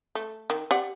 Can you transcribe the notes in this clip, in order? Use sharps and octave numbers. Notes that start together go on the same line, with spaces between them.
A3
D#3
G4 D5 F#5